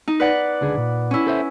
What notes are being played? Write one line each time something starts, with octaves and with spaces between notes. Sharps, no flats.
D#4
B4 D5 F#5
C#2 D3 G#4
A#2
C#4 E4
A4 C5 E5